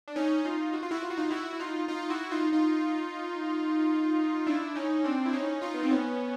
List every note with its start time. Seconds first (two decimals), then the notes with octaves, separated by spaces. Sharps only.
0.08 D4
0.16 C#4 D#4
0.45 D#4 F4
0.73 F#4
0.83 F4
0.91 E4 F#4
1.03 F4
1.10 F#4
1.17 D#4 F4
1.30 E4 F#4
1.53 E4
1.60 D#4 F4
1.88 D#4 F4
2.10 E4 F#4
2.31 D#4 F4
2.53 D#4 F4
4.47 D4 E4
4.75 C#4 D#4
5.04 C4 D4
5.26 E4
5.33 C#4 D#4
5.62 D#4 F4
5.74 B3
5.83 C4
5.91 B3 C#4